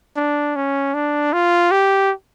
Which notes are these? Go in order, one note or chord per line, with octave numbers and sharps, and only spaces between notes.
D4
C#4
D4
F4
G4